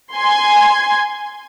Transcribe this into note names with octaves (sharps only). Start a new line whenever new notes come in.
G#5 C6 G#6